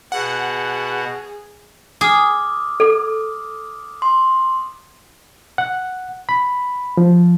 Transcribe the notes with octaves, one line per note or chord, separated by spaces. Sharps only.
B2 G#4 F#5
G#4 D6 D#6 F6
A4
C6
F#5
B5
F3